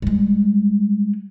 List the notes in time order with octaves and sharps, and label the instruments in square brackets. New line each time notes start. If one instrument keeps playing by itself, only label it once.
[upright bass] G3 G#3